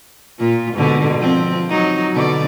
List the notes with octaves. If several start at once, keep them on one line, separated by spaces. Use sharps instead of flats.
A#2 F4
G#2 B2 D3
F3 C4
F#3 D#4
B2 D3 D5